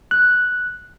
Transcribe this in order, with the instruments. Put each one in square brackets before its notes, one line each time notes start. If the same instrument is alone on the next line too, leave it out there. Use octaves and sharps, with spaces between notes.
[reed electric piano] F#6